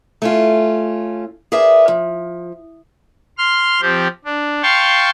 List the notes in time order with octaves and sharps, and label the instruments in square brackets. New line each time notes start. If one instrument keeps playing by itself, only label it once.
[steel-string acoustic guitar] A3 C#4 F4
G#4 A#4 B4 D5 E5
F3
[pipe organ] C6 F6
F3 C4 G4
D4
F5 G5 A5 C6 C#6